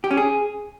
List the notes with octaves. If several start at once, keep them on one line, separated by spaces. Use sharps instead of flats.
G4
C#4
G#4